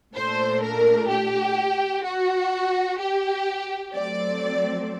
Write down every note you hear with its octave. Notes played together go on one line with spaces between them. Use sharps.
A#2 A3 D4 C5
A#4
G4
F#4
G4
F#3 A3 C4 D5